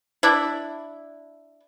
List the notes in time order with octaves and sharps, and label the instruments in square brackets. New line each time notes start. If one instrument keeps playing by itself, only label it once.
[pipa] D4 E4